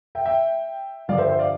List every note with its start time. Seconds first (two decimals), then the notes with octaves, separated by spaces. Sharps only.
0.15 E5 G5
0.25 E5 G5
1.08 G2 D3 F3 D5 F5
1.18 C5 E5
1.28 C5 E5
1.39 D5 F5